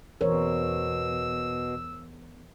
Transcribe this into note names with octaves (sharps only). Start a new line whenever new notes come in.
E2 B2 A#4 C5 C#5 E6